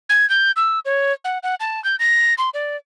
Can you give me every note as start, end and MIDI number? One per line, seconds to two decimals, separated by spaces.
0.09 0.28 92
0.30 0.52 91
0.56 0.79 88
0.85 1.13 73
1.24 1.38 78
1.43 1.55 78
1.60 1.82 81
1.84 1.96 91
1.99 2.34 94
2.38 2.49 84
2.54 2.76 74